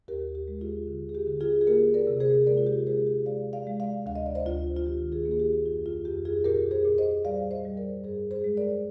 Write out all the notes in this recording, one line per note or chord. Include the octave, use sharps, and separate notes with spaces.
D#2 G4 A#4
G4
G#3
F4 G#4
D3
G#4
G4
D3
F4 G#4
G#4
A#3 G4 A#4
A#4 D5
C3
G#4 C5
G#3 A#4 D5
F4
G4
G#3 G#4 C5
G4
G#3 D5 F5
D5 F5
G#3
D5 F5
D2 F5
D#5
D5
C5 D#5
D2 F4
F4
D#3 G4
F4 G#4
A#3
G#4
G4
F2 F4
F4
F2 G4
F4 G#4
A#2 G4 A#4
G#4 C5
A#2
C5 D#5
G3 D5 F5
C5 D#5
G3
A#4 D5
G2 G#4 C5
G#4 C5
G#3
A#4 D5